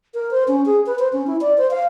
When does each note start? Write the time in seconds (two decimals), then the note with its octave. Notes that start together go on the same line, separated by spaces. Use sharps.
0.14 A#4
0.31 C5
0.48 C#4
0.66 G#4
0.86 B4
0.99 C5
1.13 C#4
1.27 E4
1.41 D5
1.58 C5
1.71 F5